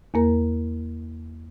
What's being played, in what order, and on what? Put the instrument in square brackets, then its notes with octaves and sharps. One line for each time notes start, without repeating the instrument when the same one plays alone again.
[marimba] E2 A#3 A#4